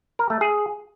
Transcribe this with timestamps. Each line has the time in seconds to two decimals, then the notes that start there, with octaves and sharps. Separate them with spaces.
0.19 A#4
0.30 A3
0.41 G#4